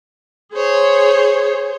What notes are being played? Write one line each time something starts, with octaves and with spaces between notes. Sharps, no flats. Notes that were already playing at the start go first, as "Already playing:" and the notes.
G#4 C5 C#5